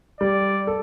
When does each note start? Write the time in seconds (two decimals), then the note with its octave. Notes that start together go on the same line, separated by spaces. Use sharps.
0.21 G3 D5
0.67 A4